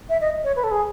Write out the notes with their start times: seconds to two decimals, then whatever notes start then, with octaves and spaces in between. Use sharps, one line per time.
0.09 E5
0.21 D#5
0.44 C#5
0.56 B4
0.64 A4
0.71 G#4